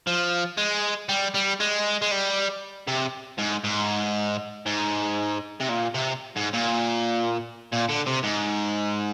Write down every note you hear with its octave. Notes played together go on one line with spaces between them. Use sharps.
F3
G#3
G3
G3
G#3
G#3
G3
C3
G#2
G#2
G#2
C3
A#2
C3
G#2
A#2
A#2
D3
C3
G#2